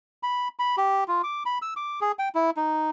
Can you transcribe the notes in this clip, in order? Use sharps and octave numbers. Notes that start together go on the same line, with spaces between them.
B5
B5
G4
F4
D6
B5
E6
D6
G#4
G5
E4
D#4